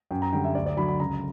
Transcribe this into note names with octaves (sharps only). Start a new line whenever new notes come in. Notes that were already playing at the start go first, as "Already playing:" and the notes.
F#2 G5
A#5
D3 G3 G5
E5
D2 D5
D5
D3 F#3 B5
B5
C#2 A#5